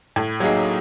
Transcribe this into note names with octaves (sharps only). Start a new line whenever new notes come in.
A2
F#3 A#3 D#4 G#4